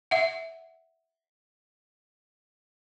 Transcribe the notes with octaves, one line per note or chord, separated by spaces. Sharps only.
E5 F#5